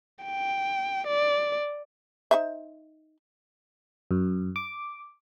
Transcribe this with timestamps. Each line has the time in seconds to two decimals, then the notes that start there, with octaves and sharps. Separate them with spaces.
0.24 G5
1.07 D5
2.31 D#4 C5 E5
4.11 F#2
4.56 D6